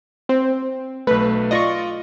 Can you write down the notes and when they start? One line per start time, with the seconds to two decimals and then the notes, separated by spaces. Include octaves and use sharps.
0.29 C4
1.07 B1 A3 B4
1.51 F4 D5 D#5 C#6 A#6